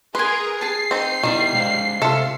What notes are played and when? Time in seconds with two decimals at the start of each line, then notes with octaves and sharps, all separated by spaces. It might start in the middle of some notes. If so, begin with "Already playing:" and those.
0.15 G#4 A#4 B4 G#5 C6
0.61 G#4 A5 C7
0.91 C4 D#4
1.23 B2 D#3 G3 E4
1.54 G#3 C5 F5
2.02 C3 F4 A4 E5